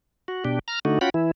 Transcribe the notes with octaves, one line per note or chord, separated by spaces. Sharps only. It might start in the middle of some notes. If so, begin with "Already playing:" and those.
F#4
B2 D4 G4
A#5 F6
D3 A3 D#4 F#4
C#4 F4 F#4 F#5 G5 B5
E3 E4